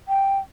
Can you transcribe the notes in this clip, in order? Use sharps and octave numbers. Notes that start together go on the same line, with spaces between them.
G5